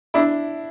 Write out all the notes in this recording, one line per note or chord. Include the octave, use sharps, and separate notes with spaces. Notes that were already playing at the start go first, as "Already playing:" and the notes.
D4 E4